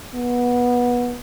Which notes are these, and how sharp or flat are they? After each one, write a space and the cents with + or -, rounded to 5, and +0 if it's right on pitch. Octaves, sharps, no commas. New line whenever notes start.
B3 -20